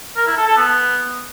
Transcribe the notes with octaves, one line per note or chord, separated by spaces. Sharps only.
A#4
E4
A4
A4
B3